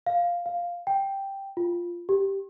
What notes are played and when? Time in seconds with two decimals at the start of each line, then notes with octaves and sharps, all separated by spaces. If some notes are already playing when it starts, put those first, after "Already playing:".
0.06 F5
0.46 F5
0.87 G5
1.57 F4
2.09 G4